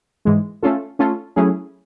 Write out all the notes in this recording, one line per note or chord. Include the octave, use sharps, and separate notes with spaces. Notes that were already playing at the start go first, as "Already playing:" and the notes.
G#2 E3 G#3
A3 C#4 F4 A4
A3 C#4 F4 A4
F#3 A3 C#4 E4 G#4